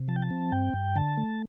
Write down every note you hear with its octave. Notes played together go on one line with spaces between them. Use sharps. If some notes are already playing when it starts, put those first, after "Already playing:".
Already playing: C3
F3 A5
G5
A5
C4
G2 G5
G2
D3 A5
A3